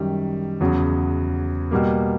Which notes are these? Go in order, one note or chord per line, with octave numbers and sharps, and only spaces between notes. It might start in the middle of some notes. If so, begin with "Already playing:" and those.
Already playing: F#2 D#3 G3
E2 C#3 F#3
B2 G3 A#3